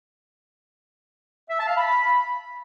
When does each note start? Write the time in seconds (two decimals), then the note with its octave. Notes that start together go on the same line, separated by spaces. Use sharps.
1.49 E5
1.58 A5
1.67 F5
1.77 B5